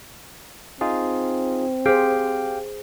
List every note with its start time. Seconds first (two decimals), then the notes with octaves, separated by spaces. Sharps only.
0.81 C4 D#4 F4 G#4
1.86 G4 G#4 C5 F5 G5